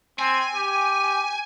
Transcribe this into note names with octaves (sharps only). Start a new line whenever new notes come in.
C4 G#5
G4